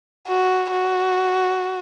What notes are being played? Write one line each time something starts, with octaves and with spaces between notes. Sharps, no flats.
F#4
F#4